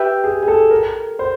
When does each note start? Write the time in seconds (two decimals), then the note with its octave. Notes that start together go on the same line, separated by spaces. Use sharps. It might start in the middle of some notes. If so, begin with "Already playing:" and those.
Already playing: G4 B4 E5 G5
0.24 G#4
0.43 G#4
0.48 A4
0.71 A#4
1.19 C5